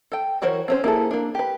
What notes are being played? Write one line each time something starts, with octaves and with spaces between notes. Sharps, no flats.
A4 G5
E3 F#4 A#4 C5 C#5
C4 C#4 C5
A#3 E4 G#4 A4
A#3 D4
G4 B4